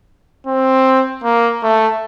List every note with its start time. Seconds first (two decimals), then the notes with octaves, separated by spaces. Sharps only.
0.47 C4
1.24 A#3
1.63 A3